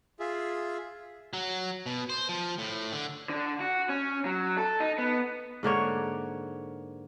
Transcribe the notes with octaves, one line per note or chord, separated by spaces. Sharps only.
F4 G#4 E5
F#3
B2
C5
F3
A2
D3
D3
F#4
C#4
F#3
A4
D#4
B3
G#2 D3 A#3 C#5